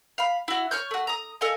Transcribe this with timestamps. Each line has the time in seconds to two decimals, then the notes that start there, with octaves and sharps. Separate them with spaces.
0.18 F5 B5
0.48 E4 F#4
0.71 C#5 C#6 F6 G6
0.91 A3 F#4
1.07 A#5 D#6
1.41 A4 D#5 F5 G#5